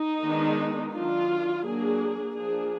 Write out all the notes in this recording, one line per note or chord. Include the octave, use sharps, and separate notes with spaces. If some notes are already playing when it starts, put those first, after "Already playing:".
Already playing: D#4
D#3 G#3 B3 D4
D#3 F#3 D4 F4
F#3 A#3 D4 G#4
F3 A#3 D4 G#4